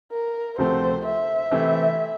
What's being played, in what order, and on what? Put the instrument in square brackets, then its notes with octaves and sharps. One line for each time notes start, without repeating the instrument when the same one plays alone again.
[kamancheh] A#4
[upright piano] D2 C3 F3 A3 C4 [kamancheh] C5
[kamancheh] E5
[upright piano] C3 E3 A3 C4 E4